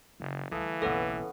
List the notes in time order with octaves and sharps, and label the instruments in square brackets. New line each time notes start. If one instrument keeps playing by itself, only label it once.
[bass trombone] F#1 [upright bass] C#3
[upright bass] D2 G3 [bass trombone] E3 [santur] A4 D#5 F5
[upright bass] F#1 B1 [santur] B3 C#4 [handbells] A4 B4